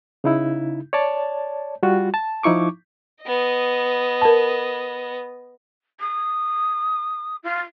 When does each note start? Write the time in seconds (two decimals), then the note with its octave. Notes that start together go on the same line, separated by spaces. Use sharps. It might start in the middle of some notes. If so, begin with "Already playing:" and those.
0.24 C#3 D#4 E4
0.93 C#5 D5 A5
1.83 G3 F4 F#4
2.14 A5
2.43 F3 D#4 E4 C#6 D6
3.23 B3 D#5
4.22 A#4 A5
6.00 D#6
7.43 F4